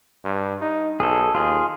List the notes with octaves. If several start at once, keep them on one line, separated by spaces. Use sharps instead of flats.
G2
D#4
B1 G#4 A4
D#2 F4 G#4